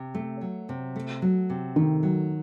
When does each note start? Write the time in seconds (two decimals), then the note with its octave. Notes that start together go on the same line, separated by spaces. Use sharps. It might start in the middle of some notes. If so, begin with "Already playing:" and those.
Already playing: C3
0.15 A3
0.41 F#3
0.69 C3
0.96 A3
1.22 F#3
1.50 C3
1.76 D#3 A3
2.03 F#3